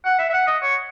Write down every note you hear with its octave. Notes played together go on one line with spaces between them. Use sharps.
F#5
E5
E5
F#5
D#5
C#5